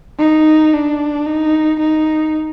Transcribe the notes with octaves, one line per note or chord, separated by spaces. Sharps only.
D#4
D4
D#4
D#4